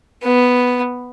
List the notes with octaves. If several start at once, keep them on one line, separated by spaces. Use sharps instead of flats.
B3